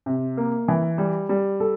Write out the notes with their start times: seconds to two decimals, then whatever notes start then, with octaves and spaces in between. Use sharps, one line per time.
0.06 C3
0.37 A#3
0.68 E3
0.98 G3
1.29 G3
1.60 A4